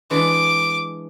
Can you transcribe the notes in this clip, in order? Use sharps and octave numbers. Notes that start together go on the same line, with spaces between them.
E3 G#3 D4 D6